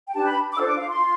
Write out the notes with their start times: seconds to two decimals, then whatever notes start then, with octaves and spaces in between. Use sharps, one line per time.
0.09 G5
0.14 D4 G4 B4 A5
0.28 B5
0.52 D6
0.56 D4 F4 A4 C5 E6
0.67 D6
0.76 F5
0.88 C6
0.98 F4